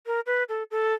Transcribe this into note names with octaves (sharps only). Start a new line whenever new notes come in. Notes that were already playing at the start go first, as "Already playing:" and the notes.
A#4
B4
A4
A4